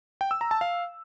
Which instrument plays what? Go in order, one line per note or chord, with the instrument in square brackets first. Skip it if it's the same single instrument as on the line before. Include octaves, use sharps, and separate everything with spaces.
[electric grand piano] G5
E6
A#5
A5
F5